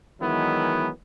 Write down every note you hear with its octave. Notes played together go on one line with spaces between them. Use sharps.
D#3 E3 F#3 G#3 B3 E4